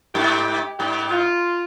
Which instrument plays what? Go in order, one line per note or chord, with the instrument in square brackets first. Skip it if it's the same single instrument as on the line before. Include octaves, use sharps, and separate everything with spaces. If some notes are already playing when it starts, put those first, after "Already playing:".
[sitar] G#2 [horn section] G4
[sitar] G#2 [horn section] G4
[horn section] F4